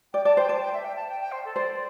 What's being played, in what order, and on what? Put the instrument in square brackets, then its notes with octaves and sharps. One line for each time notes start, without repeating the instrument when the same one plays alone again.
[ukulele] D5 [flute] G5
[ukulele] D5 [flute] A5
[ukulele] C5 [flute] G5
[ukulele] D5 [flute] A5
[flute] G5
E5
G5
A5
G5
G5
C5
A4
[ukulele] C5 [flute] D5